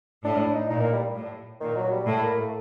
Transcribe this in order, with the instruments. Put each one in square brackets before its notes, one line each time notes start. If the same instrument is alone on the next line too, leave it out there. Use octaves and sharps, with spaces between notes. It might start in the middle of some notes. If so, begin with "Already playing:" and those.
[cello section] A2 [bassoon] D4
[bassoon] D4
D#4
[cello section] A#2 [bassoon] D#4
[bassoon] A#3
G3
[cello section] A2
[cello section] A#2 [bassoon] D#3
[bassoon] F#3
G3
[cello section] A2 [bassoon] A3
[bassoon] A#3
A3